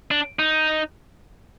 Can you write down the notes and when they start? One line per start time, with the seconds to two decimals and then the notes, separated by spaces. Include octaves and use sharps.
0.11 D4
0.39 D#4